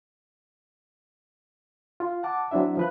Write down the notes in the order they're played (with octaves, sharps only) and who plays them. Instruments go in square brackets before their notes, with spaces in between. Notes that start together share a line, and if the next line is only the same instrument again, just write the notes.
[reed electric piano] F4
F#5 A5 D6
F#3 C4 D4 E4 E5
F3 B4 F#6